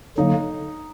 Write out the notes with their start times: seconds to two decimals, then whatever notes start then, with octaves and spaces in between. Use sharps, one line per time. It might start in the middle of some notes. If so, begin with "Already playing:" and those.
0.18 D3 F#3 A#3 D#4